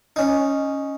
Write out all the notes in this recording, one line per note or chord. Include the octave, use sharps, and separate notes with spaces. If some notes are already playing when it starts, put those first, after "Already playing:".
C#4 D#4